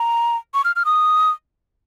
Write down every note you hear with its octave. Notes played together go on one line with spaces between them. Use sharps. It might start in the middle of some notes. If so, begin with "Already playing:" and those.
Already playing: A#5
C#6
F6
F6
D#6